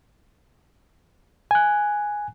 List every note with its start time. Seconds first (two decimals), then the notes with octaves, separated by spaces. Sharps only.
1.51 G#5 F#6